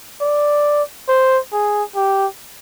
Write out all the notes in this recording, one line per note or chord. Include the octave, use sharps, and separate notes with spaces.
D5
C5
G#4
G4